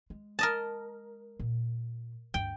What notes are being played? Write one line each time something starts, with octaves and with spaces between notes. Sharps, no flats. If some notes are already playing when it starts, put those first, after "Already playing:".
G#3
A#4 D#5 A5
A#2
D2 G2 G5